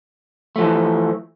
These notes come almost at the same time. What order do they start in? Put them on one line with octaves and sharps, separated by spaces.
A3 F3 E3